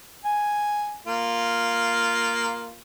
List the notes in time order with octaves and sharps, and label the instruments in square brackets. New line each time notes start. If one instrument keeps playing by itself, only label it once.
[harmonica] G#5
A#3 F4